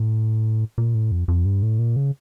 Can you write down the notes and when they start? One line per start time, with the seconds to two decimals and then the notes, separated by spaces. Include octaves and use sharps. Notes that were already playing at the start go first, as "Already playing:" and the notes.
Already playing: A2
0.78 A#2
0.95 A2
1.12 F2
1.28 F2
1.45 G2
1.62 A2
1.79 A#2
1.96 C#3